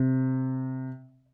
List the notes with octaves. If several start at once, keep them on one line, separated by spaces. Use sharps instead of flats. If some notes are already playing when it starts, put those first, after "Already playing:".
Already playing: C3